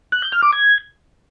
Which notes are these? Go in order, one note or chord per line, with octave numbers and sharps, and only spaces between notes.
F#6
G6
F6
D6
G#6